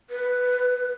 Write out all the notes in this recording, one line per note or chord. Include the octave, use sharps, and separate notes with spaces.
B4